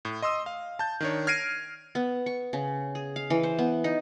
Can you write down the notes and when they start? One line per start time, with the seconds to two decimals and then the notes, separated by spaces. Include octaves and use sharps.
0.05 A2
0.22 D#5 C6 D#6 E6
0.46 F5
0.79 A5 G6
1.00 D#3 D4 C#5
1.27 F6 G#6 A#6 C7 D7 D#7
1.95 B3
2.26 C#6
2.53 C#3
2.95 G#4
3.16 F5
3.30 E3
3.43 C5
3.58 B3
3.84 D#4